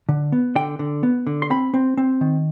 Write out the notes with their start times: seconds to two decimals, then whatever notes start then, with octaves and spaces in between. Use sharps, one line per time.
0.09 D3
0.32 B3
0.55 D3 G5
0.79 D3
1.03 B3
1.27 D3
1.42 C6
1.50 C4 B5
1.74 C4
1.97 C4
2.21 D#3